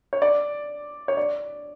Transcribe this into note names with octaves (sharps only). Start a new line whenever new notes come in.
C#5
D5
C#5
D5